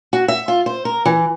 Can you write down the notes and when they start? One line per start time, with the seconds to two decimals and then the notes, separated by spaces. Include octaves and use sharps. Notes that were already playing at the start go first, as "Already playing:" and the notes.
0.13 F#4
0.28 E5
0.48 F4
0.66 C5
0.85 A#4
1.06 E3